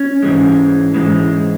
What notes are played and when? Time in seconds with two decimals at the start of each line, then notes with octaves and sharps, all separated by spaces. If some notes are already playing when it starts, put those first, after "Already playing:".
Already playing: C#4
0.23 G#2 E3 G#3
0.94 G#2 E3 G#3